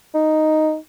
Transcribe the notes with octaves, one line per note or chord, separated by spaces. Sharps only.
D#4